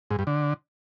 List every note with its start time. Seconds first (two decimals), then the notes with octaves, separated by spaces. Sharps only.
0.11 G#2
0.19 G2
0.27 D3